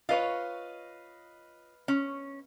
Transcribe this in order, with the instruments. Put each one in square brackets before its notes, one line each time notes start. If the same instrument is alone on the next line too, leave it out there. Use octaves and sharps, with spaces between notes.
[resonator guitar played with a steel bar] F4 C#5 [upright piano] B4 D#5 F5
[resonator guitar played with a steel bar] C#4